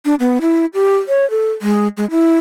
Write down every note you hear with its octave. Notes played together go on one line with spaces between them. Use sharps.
D4
B3
E4
G4
C#5
A4
G#3
G#3
E4